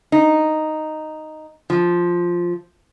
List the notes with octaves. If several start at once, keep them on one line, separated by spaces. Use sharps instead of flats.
D#4
F3